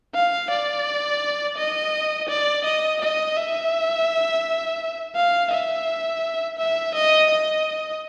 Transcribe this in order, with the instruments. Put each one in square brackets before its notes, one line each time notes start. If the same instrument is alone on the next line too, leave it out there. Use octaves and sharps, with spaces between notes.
[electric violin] F5
D5
D#5
D5
D#5
D#5
E5
F5
E5
E5
D#5
D#5